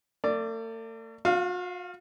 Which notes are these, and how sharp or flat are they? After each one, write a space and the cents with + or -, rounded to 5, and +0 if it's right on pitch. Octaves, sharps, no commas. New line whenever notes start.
A3 +45 D5 +0
F#4 -45 F5 +0